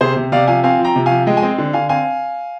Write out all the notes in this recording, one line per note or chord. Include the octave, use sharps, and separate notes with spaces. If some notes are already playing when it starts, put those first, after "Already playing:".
C3 G#4 C5
C3
C3 D5 F5
F3 F5 G#5
C4 F5 G#5
F3
G5 A#5
C3
F3 F5 G#5
G#3 D#5 G5
G#5
C4 D#5 G5
D3
D3 F5 G#5
C4 F5 G#5